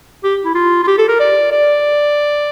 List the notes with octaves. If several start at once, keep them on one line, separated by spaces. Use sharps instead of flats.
G4
E4
F4
F4
G4
A4
A#4
D5
D5